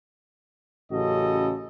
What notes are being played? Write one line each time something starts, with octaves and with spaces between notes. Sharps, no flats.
A1 C#3 F#4 A4 D#5